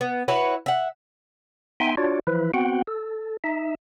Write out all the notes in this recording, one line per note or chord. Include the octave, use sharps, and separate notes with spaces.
B3
E4 F#4 B4 C#5
E5 F#5
B3 D#4 E5 G5 G#5 C6
D4 F4 F#4 C#5 D5
E3 F3 E4 B4
B3 C4 F#4 F#5 G5
A4
D#4 E5